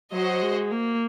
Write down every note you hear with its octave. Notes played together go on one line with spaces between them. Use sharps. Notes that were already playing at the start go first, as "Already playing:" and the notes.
F#3 F#4 C5 D#5
G#3
A#3